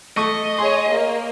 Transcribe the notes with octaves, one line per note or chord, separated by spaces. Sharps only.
A3 D#5 C#6
G#4 C#5 C6
A#3